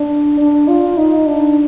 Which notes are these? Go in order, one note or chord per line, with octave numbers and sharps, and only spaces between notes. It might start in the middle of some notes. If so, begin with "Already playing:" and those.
Already playing: D4
D4
F4
D#4
D4